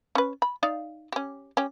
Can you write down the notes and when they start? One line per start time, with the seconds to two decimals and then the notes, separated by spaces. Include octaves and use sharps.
0.15 C#4 B4
0.42 B5
0.63 D#4 D5 F5
1.12 C#4 G4
1.57 C#4 G4